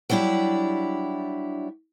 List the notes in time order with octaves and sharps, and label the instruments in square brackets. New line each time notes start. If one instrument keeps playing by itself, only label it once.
[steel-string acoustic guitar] F#3 G3 D4 E4 G4